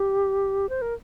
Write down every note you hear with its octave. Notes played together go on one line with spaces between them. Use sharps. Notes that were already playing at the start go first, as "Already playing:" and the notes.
Already playing: G4
C5
A#4